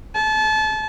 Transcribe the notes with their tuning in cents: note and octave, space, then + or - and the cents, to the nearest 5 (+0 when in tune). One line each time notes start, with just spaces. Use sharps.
A5 -30